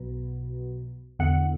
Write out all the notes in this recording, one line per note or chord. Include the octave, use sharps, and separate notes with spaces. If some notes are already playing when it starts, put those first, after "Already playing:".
Already playing: B1 B2
E2 D3 F#5